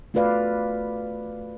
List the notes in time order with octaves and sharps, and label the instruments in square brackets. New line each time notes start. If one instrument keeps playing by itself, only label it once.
[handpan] A3 F4 F#4 B4 D5 F5